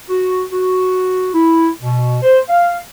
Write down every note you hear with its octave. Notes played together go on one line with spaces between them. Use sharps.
F#4
F#4
E4
B2
C5
F5